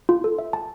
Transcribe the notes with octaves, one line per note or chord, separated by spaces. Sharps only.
F4
A4
E5
A5